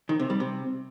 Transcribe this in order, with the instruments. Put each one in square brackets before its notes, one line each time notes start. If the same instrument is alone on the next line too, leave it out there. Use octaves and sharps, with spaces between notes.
[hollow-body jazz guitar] D#3
C3
G3
C3